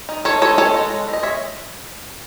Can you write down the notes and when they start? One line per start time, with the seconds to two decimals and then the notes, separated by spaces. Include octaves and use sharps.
0.09 D#4
0.25 D#3 A4 C#5
0.42 G#3 D#4 A4 C#5
0.58 D#3 A4 C#5
0.74 G#3 D#4
0.90 G#3
1.07 B3 D#4
1.13 D#5
1.23 G#3 C#5 E5